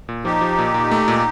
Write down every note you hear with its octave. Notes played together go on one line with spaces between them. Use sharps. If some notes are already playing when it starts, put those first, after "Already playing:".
A#2
F3 D#4 G4
F3
A#2
A#2
A3
A#2